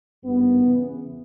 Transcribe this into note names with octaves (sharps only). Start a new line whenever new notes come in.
G#1 G2 D#3 B3
E2 C#3 E3